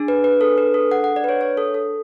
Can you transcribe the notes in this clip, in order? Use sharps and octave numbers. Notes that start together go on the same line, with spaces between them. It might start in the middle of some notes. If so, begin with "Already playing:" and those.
Already playing: D4 G#4
B4
B4
A4
B4
A4
F#5
F#5
D5
B4
C#5
C#5
A4
A4